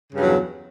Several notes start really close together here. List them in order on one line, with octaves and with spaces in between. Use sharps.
C#3 G2 F#3 E2